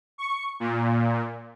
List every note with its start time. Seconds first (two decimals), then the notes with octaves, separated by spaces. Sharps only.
0.18 C#6
0.60 A#2